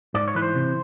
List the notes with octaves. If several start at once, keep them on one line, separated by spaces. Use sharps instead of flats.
G#2 D5
C#5
E3 B4
C5
C3